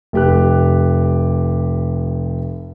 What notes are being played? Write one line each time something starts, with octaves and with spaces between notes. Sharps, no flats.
F1 G4 F#6